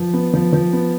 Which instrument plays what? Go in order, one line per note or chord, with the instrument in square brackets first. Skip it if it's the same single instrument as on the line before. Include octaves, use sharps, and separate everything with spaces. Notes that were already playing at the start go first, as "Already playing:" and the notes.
Already playing: [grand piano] F3
B3
F3
F3
B3